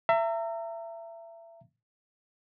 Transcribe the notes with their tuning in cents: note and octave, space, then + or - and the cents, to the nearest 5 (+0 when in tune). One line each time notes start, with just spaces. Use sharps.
E5 +25 A#5 -30